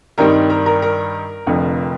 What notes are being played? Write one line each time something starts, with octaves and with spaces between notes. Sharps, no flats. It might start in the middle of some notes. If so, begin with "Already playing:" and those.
G2 D#3 G3 C4 D#4 A#4 A#5
A#4 A#5
A#4 A#5
A#4 A#5
F1 F2 D3 F3